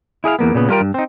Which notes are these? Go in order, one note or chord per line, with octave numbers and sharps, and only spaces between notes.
E4 G#4 D#5 F5
E2 A#3 B3
A#2 C#3 B3
F#3 G3 F4 A#4 G5
G2
C4 D#4